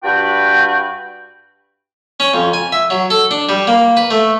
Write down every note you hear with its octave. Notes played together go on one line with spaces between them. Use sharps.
G2 G3 F#4 B4 G5
C#4
F2
G#5
E5
F#3
A4
D4
G3
A#3
B4
A3